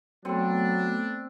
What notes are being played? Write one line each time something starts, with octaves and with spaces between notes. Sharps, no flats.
F#3 A3 B3 C4 D4 A4